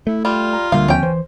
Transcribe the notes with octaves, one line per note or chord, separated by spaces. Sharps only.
A3 E4
G3 F4
A#5
D2 D3 G3 A#3 F5
D#2 F3 C4 C#4 G5
E3 C5